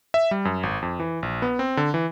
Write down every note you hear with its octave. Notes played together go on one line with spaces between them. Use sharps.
E5
G3
F#2
G#1
F2
E3
A#1
B3
C4
D3
E3